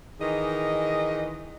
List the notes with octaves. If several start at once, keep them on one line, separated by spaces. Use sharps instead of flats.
D#3 E3 D#4 G#4 D#5